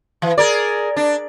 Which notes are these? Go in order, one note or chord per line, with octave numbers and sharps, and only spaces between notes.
E3
G#4 A#4 D5
D4